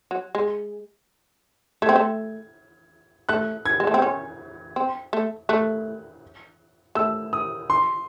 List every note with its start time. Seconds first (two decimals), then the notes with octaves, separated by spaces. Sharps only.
0.11 F#3
0.35 G#3
1.82 A3 G#6
1.89 C4
1.96 A3
3.29 A3 F#6
3.66 G#6
3.80 G#3
3.87 A3
3.94 C4
4.02 C#4
4.76 C4
5.13 A3
5.49 A3 F#6
6.95 A3 E6
7.33 D#6
7.70 C6